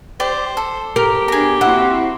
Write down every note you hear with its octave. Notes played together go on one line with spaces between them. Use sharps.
G4 C5 D5
A4
G#2 G4 A#4
B3 D4 G#4 A#5
A#3 C4 E4 F#4 F#5